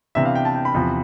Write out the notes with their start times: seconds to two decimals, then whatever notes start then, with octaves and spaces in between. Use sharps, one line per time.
0.15 C3 E3 B3 D4 E5
0.25 F5
0.35 G5
0.45 A5
0.55 G5
0.65 B5
0.74 E2 C3 F3